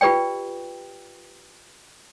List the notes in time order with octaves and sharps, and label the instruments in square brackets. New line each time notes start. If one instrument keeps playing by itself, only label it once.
[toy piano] F4 G4 B4 D5 G5